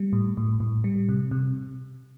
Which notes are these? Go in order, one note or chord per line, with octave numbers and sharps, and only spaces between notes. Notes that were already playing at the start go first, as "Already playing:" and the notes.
Already playing: G3
A2
A2
A2
G3
C3
C3